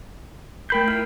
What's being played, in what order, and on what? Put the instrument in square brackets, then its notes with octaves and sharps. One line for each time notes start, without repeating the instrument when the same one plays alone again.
[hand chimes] A3 A#4 C7 [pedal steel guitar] G5 B5 G6
[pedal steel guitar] E4 F4 [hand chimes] F6